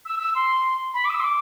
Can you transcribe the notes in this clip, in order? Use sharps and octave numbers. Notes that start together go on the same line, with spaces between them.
E6
E6
C6
B5
D6
E6
C6
D6